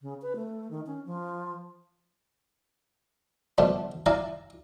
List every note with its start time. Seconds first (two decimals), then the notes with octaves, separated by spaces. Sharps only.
0.01 C#3
0.22 B4
0.36 A3
0.71 D#3
0.87 C#4
1.06 F3
3.58 G2 B2 F3 A3 B3 D4
4.06 E4 D5 F5 G#5 A#5